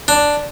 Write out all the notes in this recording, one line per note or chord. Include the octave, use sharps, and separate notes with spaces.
D4